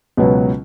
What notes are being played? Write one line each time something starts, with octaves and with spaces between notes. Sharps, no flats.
C#2 B2 F#3 B3